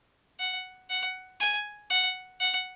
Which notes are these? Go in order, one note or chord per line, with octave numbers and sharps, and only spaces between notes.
F#5
F#5
G#5
F#5
F#5